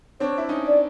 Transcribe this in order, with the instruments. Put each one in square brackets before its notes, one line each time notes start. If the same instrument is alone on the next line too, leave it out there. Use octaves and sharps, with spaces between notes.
[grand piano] C4 D4 [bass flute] C#5
[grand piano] E4
C#4 D#4
[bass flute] D5